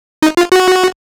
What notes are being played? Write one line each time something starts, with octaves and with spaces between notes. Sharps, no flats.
D#4
F4
F#4